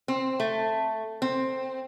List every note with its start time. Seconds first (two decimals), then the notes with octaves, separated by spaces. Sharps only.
0.08 C4
0.40 A3
1.22 C4